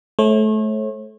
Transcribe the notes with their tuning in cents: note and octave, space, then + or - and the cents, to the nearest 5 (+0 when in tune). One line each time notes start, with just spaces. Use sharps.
A3 -25 C#5 -40